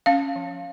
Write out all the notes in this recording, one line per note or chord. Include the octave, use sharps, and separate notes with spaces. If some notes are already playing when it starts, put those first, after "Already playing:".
C#4 F5
F3